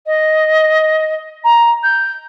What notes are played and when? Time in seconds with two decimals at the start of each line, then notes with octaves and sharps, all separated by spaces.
0.06 D#5
1.44 A#5
1.83 G6